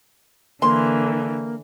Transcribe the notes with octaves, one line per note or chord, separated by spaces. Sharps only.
D3 E3 A#3 C6